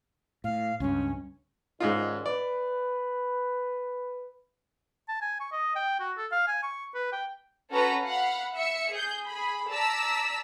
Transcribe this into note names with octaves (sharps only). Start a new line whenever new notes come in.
A2 F5
C#2 G2 C#4
G#2 D#3 G3 C#4 D#4 F4
B4 D5
A5
G#5
C#6
D#5
G5
F#4
A4
F5
G#5
C#6
B4
G5
C#4 F#4 A4 B4 A#5
F5 F#5 B5
E5 C#7
G#4 G6
G#4 B5
D5 A5 A#5 E6 B6